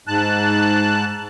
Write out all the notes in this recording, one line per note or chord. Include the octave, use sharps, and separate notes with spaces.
G#2 A5 F#6